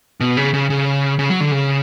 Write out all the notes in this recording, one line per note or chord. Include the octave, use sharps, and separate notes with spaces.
B2
C#3
C#3
C#3
C#3
F#3
D3
C#3